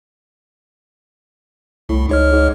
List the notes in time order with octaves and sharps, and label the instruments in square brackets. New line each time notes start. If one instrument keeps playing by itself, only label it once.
[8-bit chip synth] C2 [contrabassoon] A2
[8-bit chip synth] C#2 C#5 F6 [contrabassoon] G#2
[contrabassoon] G#2